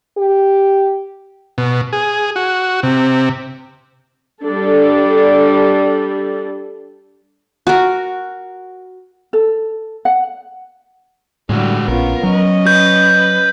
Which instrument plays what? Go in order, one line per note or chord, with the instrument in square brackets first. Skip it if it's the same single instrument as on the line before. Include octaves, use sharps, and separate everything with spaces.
[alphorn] G4
[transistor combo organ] B2
G#4
F#4
C3
[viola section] G3 D4 A4
[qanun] F#4 A#4
[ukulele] A4
F#5
[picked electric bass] A2 [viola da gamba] D3 G3 [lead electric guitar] G#3 F#4
[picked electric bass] A#1 [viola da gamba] B3 C#4 F4 [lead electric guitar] A#4
[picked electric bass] F#3 [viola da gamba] C#4 D#5
[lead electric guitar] B4 [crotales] G6